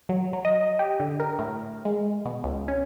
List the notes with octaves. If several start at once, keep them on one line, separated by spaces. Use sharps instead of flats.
F#3
F#3
D#5
G4
D3
A#4
A2
G#3
B2
C#2
C#4